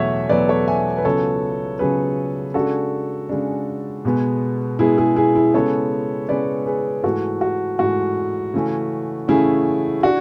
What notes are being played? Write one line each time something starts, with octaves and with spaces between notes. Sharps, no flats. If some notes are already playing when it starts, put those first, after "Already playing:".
Already playing: E2 B2 F#3 A3 C#5 E5 F#5
E2 B2 F#3 A3 B4 D5
A4 C#5
E5 G#5
B4
C#2 C#3 F#3 B3 A4 C#5
C#2 C#3 F#3 B3 G#4 B4
C#3 G#3 D4 F#4 A4
C#3 G#3 D4
B2 G#3 B3
B2 G#3 B3 E4 G#4
E4 G#4
E4 G#4
E4
C#3 G#3 B3 A4 C#5
C#3 G#3 B3 B4 D5
G#4 B4
G#2 E3 A3 F#4 A4
F#4
G#2 E3 A3 F#4
C#3 E3 A3 C#4
C#3 E3 A3 C#4 E4 G#4
D4 F#4